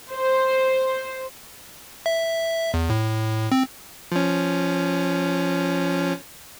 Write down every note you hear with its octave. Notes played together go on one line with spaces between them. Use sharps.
C5
E5
E2
A2
C4
F3 C#4